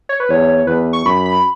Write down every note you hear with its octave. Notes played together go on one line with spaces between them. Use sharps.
C#5
B4
E2 C#5
E2 B4
C#6
F#2 B5
B5